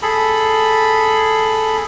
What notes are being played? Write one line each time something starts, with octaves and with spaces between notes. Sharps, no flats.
G#4 A4 B5